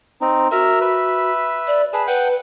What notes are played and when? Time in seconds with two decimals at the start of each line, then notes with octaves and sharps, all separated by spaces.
0.21 C4 D#4
0.52 F#4 A#4 E5
0.81 B4 E5
1.67 D5
1.93 G#4 B4 A5
2.07 B4 F#5 G5